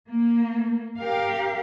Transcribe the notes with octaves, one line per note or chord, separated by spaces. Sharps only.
A#3
G4 A#4 F5